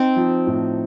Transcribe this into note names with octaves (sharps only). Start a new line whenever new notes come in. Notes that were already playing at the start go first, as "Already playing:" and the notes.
Already playing: C4 D#4
F3
A2